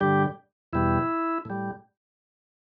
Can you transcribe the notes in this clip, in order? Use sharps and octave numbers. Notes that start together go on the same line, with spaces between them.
G2 D3 G3 G4
E2 B2 G3 E4
A2 G3